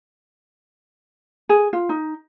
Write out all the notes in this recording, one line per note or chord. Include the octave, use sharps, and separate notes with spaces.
G#4
F4
D#4